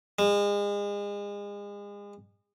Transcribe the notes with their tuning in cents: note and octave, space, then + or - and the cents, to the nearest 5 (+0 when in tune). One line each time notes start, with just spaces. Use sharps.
G#3 -35